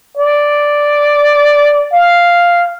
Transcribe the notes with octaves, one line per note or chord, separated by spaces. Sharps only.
D5
F5